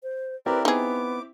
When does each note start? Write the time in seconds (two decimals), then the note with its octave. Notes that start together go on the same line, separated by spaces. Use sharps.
0.03 C5
0.46 C4 E4 G4 A#4 B4 D5
0.65 B3 D#4 G#4 D6